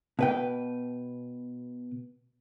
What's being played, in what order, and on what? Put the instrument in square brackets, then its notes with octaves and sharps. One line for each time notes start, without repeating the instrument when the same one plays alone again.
[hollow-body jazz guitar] B2 B4 G5